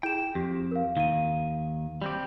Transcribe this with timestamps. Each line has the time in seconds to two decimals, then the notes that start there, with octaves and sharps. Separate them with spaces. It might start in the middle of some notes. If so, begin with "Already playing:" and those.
0.03 E4 G#4 G5 E7
0.35 F2 G4
0.71 A#4 F5
0.97 D#2 D#3 F5 D#7
2.02 G3 C4 G4